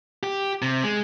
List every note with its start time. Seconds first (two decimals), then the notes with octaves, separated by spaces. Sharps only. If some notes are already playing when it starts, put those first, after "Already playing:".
0.23 G4
0.62 C3
0.83 G#3